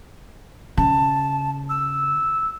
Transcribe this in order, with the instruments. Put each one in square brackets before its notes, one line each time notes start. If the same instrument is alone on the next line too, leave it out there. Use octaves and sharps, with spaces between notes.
[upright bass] C#3 [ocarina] A5
[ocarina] E6